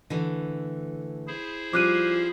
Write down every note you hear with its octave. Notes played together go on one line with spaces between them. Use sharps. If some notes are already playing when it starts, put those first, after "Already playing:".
D3 E3 A3
E4 G#4 C5
F3 G3 C#4 D6 F#6 D#7